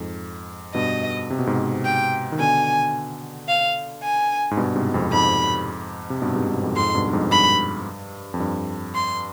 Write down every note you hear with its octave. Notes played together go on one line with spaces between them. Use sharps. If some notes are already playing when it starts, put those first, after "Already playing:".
Already playing: F2 G#2
G2 B2 D#5
C3
B2
G#2 C3
G5
D#3
B2 D3 G#5
F5
G#5
G#2
G2 B2
G#2 C3
F2 G#2
F2 G#2 B5
C3
G2 B2
G#2 C3
G2 B2
F2 G#2
F2 G#2 C6
G2 B2
G2
F2 G#2
G2 B5
F2
G2
C6